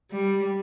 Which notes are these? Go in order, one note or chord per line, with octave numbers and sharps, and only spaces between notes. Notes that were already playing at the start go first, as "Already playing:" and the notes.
G3